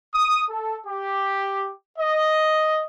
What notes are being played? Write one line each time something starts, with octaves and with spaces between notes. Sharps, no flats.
D#6
A4
G4
D#5